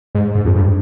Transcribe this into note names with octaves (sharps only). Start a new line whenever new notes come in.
G#2
G#2
F2
G2